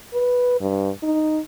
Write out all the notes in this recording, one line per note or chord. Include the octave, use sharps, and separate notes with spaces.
B4
G2
D#4